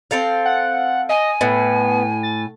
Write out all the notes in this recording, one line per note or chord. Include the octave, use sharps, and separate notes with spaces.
C4 A4 F5
F#5
D#5 G#5
A2 B3
A6